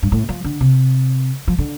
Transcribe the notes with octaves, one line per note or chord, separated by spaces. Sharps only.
G2
A2
F3
D3
C3
F3
D3